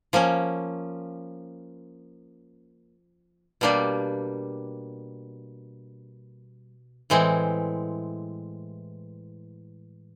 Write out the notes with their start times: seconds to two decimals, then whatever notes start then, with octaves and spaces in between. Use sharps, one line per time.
0.13 F3 A#3 C#4
3.61 B2 G3 A#3 D4 G4
7.10 A2 E3 G#3 C4